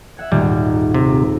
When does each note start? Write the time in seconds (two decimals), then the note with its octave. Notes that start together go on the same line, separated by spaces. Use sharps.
0.17 E5 F#5 G#6
0.32 D#1 G#1 G3
0.94 C3